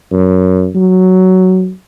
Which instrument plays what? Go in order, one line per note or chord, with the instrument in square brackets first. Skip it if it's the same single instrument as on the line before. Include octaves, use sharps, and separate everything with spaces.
[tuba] F#2
F#3